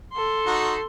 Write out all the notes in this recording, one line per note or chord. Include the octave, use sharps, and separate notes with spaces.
A4 C6
D#4 F#4